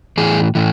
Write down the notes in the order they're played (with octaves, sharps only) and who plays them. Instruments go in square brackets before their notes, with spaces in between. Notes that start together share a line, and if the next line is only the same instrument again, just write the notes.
[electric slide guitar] A2 E3 G#4
A2 E3